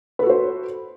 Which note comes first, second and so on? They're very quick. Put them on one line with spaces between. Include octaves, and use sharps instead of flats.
B4 A4 F#4 C5